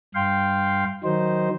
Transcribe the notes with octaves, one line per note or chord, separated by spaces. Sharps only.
G2 F5 G5 C6
D#3 F#3 D#4 C5